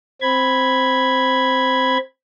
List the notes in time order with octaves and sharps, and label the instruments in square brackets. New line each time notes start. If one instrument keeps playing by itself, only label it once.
[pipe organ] C4 B5 G#6